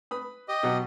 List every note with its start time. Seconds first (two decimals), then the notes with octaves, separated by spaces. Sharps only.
0.11 B4 B5 D#6
0.48 G4 D#5
0.63 B2 F#3 F#5